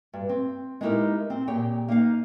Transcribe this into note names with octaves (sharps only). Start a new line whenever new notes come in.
G2
C4
G#3 B3 D#4 E4 G4 A#4
C4
A#2 G4 G#4 C#5 G5
A#3 D#4 F5